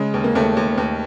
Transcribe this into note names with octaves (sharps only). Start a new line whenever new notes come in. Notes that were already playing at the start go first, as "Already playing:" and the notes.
Already playing: C#3 G#3
D#2
A#3
D#2 A3
D#2
D#2